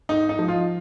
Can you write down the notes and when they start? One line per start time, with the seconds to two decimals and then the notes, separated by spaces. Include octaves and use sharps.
0.09 G#2 D#4
0.29 D#4
0.39 F3
0.48 F4